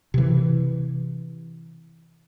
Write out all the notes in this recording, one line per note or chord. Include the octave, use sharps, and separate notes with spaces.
C3 E3